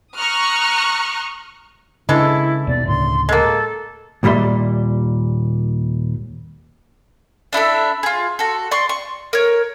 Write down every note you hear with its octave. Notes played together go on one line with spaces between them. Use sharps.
A#5 C#6 D#6 F6 F#6
C#3 E3 G#3 D4 E4 A4
D#2 B2 D5
D2 A2 C#3 C6
G#3 A#3 A4
D#2 A#2 G3 E5 C6
D4 E4 A4 E5
F4 G#4
F#4 A4
D5 C6 C#6
C#6
A#4 C#5